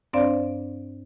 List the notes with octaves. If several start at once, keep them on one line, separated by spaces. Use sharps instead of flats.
G2 C4 D4 C5 D5 F5